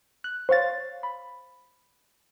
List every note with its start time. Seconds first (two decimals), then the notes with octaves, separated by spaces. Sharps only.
0.24 F#6
0.49 C5 C#5 F5 A6
1.03 B5